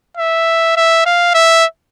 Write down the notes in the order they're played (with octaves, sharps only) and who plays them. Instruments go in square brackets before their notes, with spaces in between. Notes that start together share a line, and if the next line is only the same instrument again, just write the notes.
[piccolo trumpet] E5
E5
F5
E5